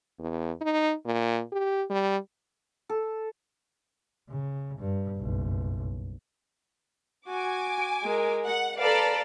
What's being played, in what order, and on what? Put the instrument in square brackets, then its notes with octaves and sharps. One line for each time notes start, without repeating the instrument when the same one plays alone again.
[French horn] E2
D#4
A#2
G4
G3
[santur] A4
[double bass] C#3
G2
F#1 B1
[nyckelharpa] F#4 [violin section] G#5 D6
[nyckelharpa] G#3 A#4
[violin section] F#5
[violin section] A4 B4 D5 [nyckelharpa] F5 A#5